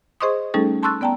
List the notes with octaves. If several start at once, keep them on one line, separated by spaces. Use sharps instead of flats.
G#4 C5 D#5 C6 C#6 D#6
G3 A3 C#4 D#4 G#4 A4
A5 C6 C#6 E6 F#6 A6
B3 D5 G5 A5 A#5